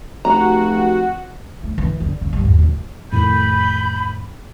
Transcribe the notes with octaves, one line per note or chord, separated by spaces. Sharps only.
F1 F#4 F#5 A#5
A3
E3
D3
C#3
G1
D#2
D1
F2 A2 D#3 B5 G6